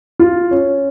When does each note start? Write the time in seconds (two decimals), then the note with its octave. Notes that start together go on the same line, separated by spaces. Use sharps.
0.19 F4
0.51 C#4